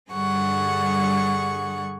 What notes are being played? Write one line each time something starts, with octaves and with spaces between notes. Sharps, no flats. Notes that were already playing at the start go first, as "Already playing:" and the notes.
G2 D3 G3 G#4 F#5 C#6